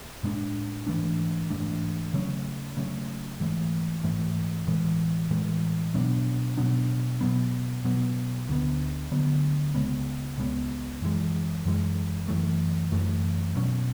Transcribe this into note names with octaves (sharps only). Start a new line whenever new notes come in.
A2 G#3 B3 D4
G#2 E3 A3 D4
G#2 E3 A3 D4
C#3 F#3 A3 C#4
C#3 F#3 A3 C#4
G#2 E3 A3
G#2 E3 A3
A2 E3 G#3
A2 E3 G#3
B2 F#3 B3 D4
B2 F#3 B3 D4
B2 F#3 B3
B2 F#3 B3
D2 D3 F#3 B3
D2 D3 F#3 B3
C#2 C#3 G#3 B3
C#2 C#3 G#3 B3
F#2 E3 G#3
F#2 E3 G#3
F#2 E3 A3
F#2 E3 A3
B2 F#3 C#4